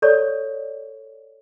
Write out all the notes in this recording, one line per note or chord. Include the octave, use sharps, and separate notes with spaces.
A4 C#5 D5 C#6